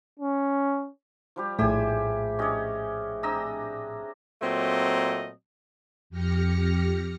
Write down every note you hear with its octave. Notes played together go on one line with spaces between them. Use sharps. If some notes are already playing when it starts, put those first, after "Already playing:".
C#4
F3 G3 G4
A#1 A2 G4 G#4 C5 E5 G#5
C#4 D4 G4 C#5 D#5
C4 D4 D#5 A#5 E6
A#2 F#3 A3 C4 D#5
F2 G4 F6 A#6 C#7